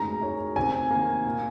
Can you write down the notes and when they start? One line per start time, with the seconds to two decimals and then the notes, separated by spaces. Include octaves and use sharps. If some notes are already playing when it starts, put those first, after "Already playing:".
Already playing: G#3 A#5
0.21 D#4 A#4 C#5
0.56 C3 G#5
0.91 D#3 A#3
1.25 A#2